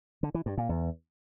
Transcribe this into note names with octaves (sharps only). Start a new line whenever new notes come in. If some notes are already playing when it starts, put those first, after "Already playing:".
D3
E3
G2
A#2
E2